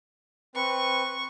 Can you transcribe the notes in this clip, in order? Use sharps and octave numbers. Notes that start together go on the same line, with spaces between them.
C4 B4 C#6